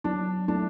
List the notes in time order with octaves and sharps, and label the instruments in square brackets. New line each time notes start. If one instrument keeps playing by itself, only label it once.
[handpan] F#3 [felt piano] D4
[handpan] A3 E4 [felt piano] D4